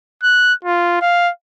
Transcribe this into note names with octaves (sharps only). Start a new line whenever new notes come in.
F#6
F4
F5